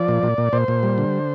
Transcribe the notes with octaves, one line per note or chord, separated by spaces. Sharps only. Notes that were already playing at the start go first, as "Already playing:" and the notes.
Already playing: F3 D5
A#2
A#2
A#2
A#2 C5
A#2
G3
D3